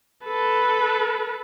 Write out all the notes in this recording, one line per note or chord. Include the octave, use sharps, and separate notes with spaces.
A4 B4